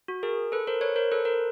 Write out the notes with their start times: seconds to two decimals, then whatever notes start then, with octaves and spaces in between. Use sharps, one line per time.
0.08 F#4
0.23 G#4 A#4
0.52 A4 B4
0.67 A#4 C5
0.81 B4 C#5
0.96 A#4 C5
1.12 A4 B4
1.25 A#4 C5